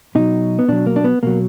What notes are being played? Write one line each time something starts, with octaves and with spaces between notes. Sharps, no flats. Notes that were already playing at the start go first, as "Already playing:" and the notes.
B2 F#3 D#4
B3
B2 F#3 D4
A#3
D4
B3
B2 F#3 A#3